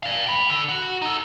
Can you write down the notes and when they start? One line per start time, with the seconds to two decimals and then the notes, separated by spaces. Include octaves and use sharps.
0.03 D5 F5
0.26 G5 B5
0.49 D3
0.69 F#4 F#5
1.02 D#4 A4